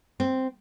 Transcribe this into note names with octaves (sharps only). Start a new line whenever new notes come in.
C4